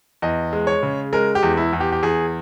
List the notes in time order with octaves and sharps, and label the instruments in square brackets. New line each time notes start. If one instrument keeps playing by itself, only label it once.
[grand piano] E2 D#5
G#3
C#5
C#3
G#3 A#4
G4
E2
E4
E2
G4
G4
E2 G#4